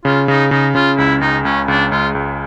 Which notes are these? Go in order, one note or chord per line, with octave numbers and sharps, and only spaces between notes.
C#3 F4
C#3 D#4
C#3 D#4
C#3 F4
C#2 E4
C#2 D#4
C#2 C#4
C#2 D4
C#2 F4
C#2